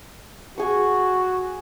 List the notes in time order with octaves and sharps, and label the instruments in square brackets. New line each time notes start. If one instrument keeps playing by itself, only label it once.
[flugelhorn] F#4 [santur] G#4 C#6